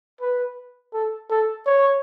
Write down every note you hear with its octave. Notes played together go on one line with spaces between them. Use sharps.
B4
A4
A4
C#5